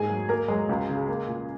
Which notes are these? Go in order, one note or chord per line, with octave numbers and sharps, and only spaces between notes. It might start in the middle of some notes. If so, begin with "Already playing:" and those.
Already playing: G#2 A#3 G#4 G#5
F#3
A#3 A#4 A#5
F#3 G#3 G#4
C#2
C#3
A#3
A#2